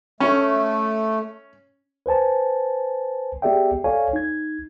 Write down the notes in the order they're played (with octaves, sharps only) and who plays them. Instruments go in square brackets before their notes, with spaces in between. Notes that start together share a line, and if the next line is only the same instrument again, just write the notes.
[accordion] A3 [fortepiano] C#4
[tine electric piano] B4 C5 G#5 A5
B3 G4 G#4 D5 E5 G5
A4 C#5 D5 F5 G#5
D#4 G#6